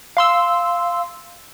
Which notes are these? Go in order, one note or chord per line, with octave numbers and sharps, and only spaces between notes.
F5 C6 E6